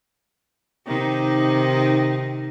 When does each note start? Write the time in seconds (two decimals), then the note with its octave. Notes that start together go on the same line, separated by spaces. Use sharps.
0.86 C3 D#3 D#4